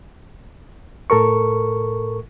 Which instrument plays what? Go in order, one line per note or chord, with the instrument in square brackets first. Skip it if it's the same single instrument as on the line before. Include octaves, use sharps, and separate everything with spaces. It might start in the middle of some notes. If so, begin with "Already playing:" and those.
[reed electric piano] A2 A4 A#4 C#6